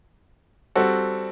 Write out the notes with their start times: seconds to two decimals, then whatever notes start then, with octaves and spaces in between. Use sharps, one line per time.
0.75 G3 C4 F#4 A4